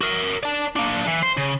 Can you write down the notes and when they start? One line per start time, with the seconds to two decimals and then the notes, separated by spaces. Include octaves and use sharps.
0.01 F#4 A#4
0.43 D5 A5
0.76 A#3 D4
1.06 E3
1.23 C5
1.37 C#3